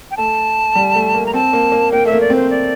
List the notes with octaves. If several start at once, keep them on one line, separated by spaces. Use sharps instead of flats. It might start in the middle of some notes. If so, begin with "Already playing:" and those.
G5
A3 A5
G3
A3
A#3
A#5
C4 A5
A#3
A#3
A#3 G5
A3 E5
A#3
D5
C4 C5
D5